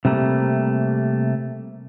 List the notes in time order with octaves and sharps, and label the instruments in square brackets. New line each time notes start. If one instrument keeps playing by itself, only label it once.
[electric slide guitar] C3 G3 A3 A#3